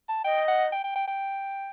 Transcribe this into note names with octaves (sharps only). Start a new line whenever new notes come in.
A5
D#5 G5
F#5
G5
G5
G5
G5